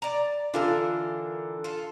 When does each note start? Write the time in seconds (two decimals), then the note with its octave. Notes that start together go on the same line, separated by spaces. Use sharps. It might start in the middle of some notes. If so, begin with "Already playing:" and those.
0.02 D5 A#5
0.54 D3 E3 D4 F4 A4 A#4
1.64 F4 A4